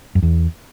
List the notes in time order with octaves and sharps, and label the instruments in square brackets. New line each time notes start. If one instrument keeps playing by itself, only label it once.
[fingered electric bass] F#2
E2